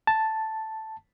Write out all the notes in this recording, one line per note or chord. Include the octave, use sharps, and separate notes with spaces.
A5